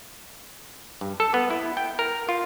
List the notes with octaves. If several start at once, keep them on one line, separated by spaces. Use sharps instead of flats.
G2
A4
B3
E4
G5
A#4
F4